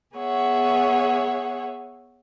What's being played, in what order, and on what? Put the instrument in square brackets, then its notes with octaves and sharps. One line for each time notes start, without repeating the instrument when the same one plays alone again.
[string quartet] B3 G#4 C#5 E5 F#5